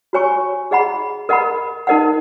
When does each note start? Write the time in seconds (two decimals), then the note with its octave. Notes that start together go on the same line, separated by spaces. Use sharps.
0.13 F#4 C#5 G#5 C#6
0.71 G#4 D#5 F#5 B5
1.29 A#4 D#5 F#5 B5
1.87 D#4 A#4 D#5 F#5